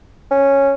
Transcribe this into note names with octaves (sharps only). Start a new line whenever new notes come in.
C#4